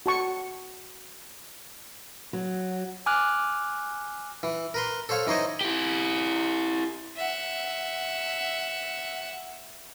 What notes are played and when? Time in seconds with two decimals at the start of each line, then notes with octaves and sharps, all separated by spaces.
0.06 F#4 A5 C#6
2.33 F#3
3.06 G#5 D6 F6 F#6
4.43 E3
4.74 A#4 B4 C6
5.09 A4 C5 C#5 F5
5.27 E3 D#4 C5 C#5 D#5
5.61 E4 G4
7.16 E5 F#5